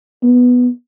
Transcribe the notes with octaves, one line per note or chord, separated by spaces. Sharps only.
B3